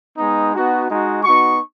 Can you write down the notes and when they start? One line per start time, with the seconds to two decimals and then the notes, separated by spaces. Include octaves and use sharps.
0.18 G#3 B3 D#4
0.53 B3 D#4 F#4
0.88 G#3 D#4 F#4
1.24 B3 D#4 F#4 C#6